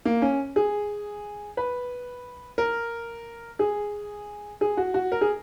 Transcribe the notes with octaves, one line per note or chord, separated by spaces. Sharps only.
A#3
C#4
G#4
B4
A#4
G#4
G#4
F#4
F#4
A#4
G#4